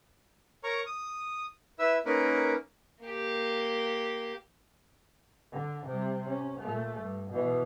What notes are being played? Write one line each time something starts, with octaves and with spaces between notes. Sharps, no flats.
A#4 C#5 A#5 C#6
D#6
E4 B4 E5 E6
A#3 C#4 D#4 A#4 B4
A#3 G4
D3
C3 G3
C#4
A#2 A3
G2
B2 E3